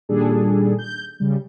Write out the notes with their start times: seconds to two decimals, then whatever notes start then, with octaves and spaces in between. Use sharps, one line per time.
0.09 A#2 D#3 G3 D4 G#4 A4
0.79 G6
1.20 C#3 G3